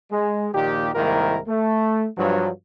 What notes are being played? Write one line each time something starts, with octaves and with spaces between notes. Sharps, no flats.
G#3
A#1 D#2 A#2 D#3 G4
C2 G#2 D#3 A#3 E4 A#4
A3
G2 F3 F#3